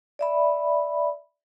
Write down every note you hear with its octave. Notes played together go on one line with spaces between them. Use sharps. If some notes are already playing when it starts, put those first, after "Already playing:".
D5 E5 B5